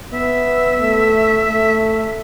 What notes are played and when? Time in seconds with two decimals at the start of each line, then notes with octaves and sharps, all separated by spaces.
0.13 B3 E5
0.80 A3
1.48 A3